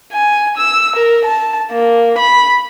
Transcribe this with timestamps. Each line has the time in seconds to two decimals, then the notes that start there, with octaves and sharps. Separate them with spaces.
0.13 G#5
0.57 E6
0.96 A#4
1.25 A5
1.72 A#3
2.18 B5